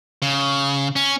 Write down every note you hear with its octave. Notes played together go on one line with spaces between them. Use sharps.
C#3
C#4